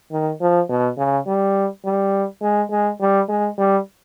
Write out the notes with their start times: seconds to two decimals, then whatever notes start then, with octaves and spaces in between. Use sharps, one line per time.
0.12 D#3
0.41 F3
0.69 B2
0.98 C#3
1.27 G3
1.85 G3
2.42 G#3
2.71 G#3
3.00 G3
3.29 G#3
3.58 G3